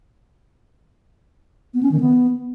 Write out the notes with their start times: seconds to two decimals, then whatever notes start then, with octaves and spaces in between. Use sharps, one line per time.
1.74 B3
1.83 C#4
1.92 D#3
2.00 B3